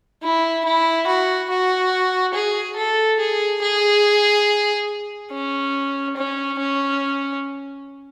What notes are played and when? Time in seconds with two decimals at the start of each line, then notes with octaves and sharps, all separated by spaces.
0.23 E4
0.65 E4
1.07 F#4
1.50 F#4
2.34 G#4
2.77 A4
3.20 G#4
3.62 G#4
5.31 C#4
6.17 C#4
6.59 C#4